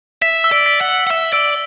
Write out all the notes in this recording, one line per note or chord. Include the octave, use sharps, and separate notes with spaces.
E5 B6
E6
D5
B6
F#5
F#7
F#5
E5 E6
D5 E6